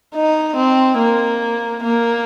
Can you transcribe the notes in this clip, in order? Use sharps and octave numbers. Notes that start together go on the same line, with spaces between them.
D#4
C4
A#3
A#3